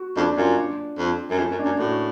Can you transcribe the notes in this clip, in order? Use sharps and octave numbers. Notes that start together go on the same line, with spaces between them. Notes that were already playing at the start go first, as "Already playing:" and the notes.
Already playing: F#4
F2 D4
F#2 F4
D4
F2
F#2
F2 C#4
F#2
D4
F#2
A2 F#4